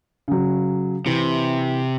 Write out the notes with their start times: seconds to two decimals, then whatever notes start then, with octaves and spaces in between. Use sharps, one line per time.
0.28 C#3 F#3
1.06 C3 E3